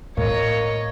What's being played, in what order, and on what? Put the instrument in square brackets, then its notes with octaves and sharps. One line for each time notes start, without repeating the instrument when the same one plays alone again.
[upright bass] A2 [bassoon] A#3 [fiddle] C#5 D#5